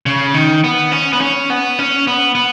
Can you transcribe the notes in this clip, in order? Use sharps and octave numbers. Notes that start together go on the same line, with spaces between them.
C#3
D#3
B3
C#4
B3
C#4
B3
C#4
B3
B3